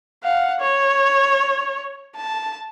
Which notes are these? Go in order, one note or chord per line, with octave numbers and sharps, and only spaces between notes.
F5 F#5
C#5
A5